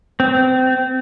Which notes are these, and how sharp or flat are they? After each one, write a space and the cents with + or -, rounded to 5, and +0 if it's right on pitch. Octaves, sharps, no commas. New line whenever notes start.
C4 -25